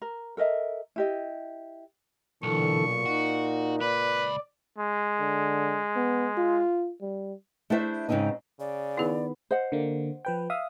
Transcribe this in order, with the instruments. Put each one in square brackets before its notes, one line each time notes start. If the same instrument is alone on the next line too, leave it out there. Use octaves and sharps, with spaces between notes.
[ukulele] A#4
A4 A#4 D#5 E5
E4 G4 D#5
[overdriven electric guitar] B1 [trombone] A#2 [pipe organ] D3 E3 A4 [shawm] C#6
[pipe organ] D#4 [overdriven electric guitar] F#4
[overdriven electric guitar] C#2 B5 [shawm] B4 [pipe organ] D5
[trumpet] G#3
[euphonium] D3
B3
F4
G3
[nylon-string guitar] A3 D4 E4 G#4 C5 E5
G#2 C#3 C4 C#4 D#4
[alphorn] C#3 [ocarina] D5
[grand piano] D#3 B3 [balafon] E4 G#4
[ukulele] C5 D#5 F#5
[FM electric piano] D3 A#3
F3 B4 G5
E5 F5 D#6